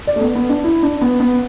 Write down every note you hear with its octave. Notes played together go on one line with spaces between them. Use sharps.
D5
A3
B3
B3
D4
E4
D4
B3
B3